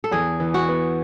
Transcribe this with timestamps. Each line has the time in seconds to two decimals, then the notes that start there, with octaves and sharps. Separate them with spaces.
0.04 A4
0.11 E2 G#4
0.40 E3
0.54 F#4
0.69 B3